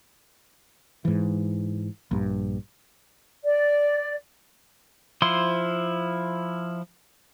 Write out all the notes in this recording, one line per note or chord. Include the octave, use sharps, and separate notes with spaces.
G#2 E3
A#1 G2
D5
F3 E4 C5 C6